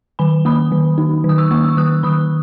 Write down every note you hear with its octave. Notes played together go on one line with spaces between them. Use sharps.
D#3 G#5 B5
A#3 B5 D#6
D#3
D#4
D#3
D#6
C#6 E6
A#3 C#6 E6
C#6 E6
D#3 D#6 F#6
D#3 B5 D#6